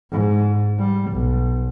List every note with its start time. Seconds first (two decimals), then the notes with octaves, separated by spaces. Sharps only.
0.11 G#2
0.78 G3
1.11 B1